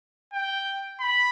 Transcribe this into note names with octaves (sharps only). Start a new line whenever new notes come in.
G5
B5